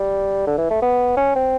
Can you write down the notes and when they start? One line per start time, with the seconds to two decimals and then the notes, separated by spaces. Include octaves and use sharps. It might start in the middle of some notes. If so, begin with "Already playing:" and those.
Already playing: G3
0.46 D3
0.58 E3
0.70 A3
0.82 B3
1.17 C#4
1.36 C4